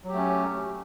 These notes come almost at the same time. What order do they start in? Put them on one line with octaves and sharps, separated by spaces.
F#3 G4 A3 C#4